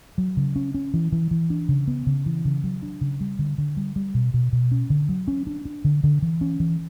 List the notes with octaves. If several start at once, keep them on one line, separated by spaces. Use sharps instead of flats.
F#3
C#3
C#4
C#4
E3
E3
E3
D4
C#3
B3
C#3
E3
C#3
F#3
D4
C#3
G3
D3
D3
G3
G3
B2
B2
B2
C#4
D3
F#3
C#4
D4
D4
D3
D3
E3
C#4
E3